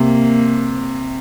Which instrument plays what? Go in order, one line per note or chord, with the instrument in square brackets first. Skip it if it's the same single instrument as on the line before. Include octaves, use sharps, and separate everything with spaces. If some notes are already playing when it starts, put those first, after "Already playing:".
Already playing: [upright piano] C3 [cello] A#3